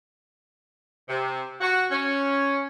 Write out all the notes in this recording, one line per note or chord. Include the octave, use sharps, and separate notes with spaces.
C3
F#4
C#4